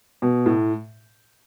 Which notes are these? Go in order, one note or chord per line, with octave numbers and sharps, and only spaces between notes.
B2
A2